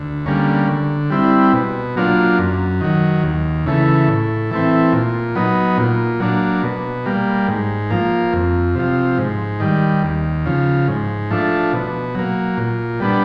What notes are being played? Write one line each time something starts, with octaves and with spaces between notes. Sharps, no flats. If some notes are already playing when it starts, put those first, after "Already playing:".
Already playing: D2
D3 G3 A#3 C#4
D3
G3 C4 E4
B2
F#3 A#3 D4 F4
F#2
D#3 F#3
D#2
C#3 E3 A3
A2
E3 A3 C4
A#2
F#3 B3 D#4
A#2
F#3 A#3 D4
B2
G3 A#3
G#2
F3 A#3
F2
C3 F3
G#2
D#3 G3
D#2
C#3 F3
G#2
F3 A3 D4
B2
F#3 A#3
A#2
G3 B3 D4